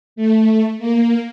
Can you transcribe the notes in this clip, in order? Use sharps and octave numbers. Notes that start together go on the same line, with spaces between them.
A3
A#3